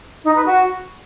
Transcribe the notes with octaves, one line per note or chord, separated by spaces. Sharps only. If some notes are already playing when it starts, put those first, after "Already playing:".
D#4
B4
F#4